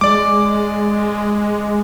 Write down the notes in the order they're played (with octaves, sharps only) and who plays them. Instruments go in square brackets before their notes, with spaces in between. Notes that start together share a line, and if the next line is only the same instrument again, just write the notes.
[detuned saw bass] G#3 [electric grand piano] D5 D6